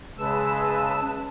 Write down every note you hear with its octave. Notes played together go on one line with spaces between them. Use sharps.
C#3 G#3 B4 A5 E6